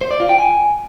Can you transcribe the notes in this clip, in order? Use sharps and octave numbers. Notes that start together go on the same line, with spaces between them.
C5
D5
F4
G5
G#5